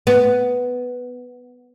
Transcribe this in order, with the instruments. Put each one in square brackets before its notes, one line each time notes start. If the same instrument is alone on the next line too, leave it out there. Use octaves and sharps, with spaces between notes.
[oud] B3